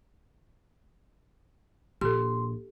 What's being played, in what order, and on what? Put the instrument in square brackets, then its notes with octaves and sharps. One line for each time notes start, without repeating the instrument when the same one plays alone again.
[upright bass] A#1 [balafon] G4 A4 [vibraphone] C6